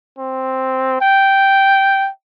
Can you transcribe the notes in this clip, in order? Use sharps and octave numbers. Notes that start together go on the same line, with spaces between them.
C4
G5